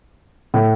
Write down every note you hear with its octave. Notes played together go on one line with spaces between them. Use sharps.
A2